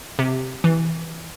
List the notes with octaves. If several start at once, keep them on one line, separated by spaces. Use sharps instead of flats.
C3
E3